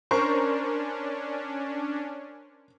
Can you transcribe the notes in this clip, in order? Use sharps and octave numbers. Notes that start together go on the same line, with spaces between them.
C#4 D4 A#4 C5 C#6